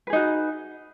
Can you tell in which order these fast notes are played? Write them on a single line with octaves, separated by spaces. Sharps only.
B4 G#4 D#4 F#4